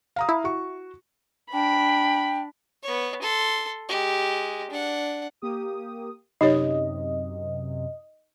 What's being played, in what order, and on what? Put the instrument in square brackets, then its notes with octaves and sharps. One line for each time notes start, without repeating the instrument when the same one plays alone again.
[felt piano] F5 A#5 D#6
[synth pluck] E4
[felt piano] F#4 C#6
[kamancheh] D4 [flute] G5 [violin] B5
[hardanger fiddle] B3 C#5
A4 C6
G#3 G4
D4 F#5
[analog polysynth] A#3 G4 D#6
[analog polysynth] F#2 C3 [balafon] D#4 G4 C#5 [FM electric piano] D#5